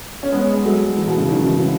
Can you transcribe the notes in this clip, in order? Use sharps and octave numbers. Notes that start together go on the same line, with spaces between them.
C#4
G#3 B3
G#3
F#3 A3
E3 G#3
B2
C#3
D#3 F#3
C#3 E3
C#3 E3